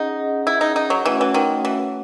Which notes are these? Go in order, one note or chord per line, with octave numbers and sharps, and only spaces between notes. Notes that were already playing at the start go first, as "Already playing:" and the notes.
Already playing: C#4 D#4 G#4 D#5 F#5
E4
D#4
D#4
F#3
E3 A3 C#4 F#4 C#5 F#5
E3
D#3
E3